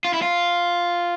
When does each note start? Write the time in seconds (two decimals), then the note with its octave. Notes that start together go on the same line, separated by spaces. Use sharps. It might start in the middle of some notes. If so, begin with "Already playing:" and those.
0.05 F4
0.13 E4
0.22 F4